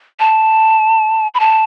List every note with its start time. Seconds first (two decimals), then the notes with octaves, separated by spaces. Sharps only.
0.20 A5
1.34 B5
1.40 A5